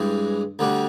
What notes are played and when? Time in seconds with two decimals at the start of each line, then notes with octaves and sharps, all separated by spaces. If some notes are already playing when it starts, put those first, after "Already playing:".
Already playing: G2 E3 G#3 C4
0.59 D2 D3 G3